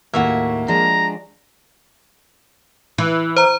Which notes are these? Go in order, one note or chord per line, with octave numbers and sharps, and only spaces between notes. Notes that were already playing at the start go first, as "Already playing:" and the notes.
D#2 A2 A#3 F#4 C#5 E5
F3 G#3 D4 A#5
E3
C5 A#5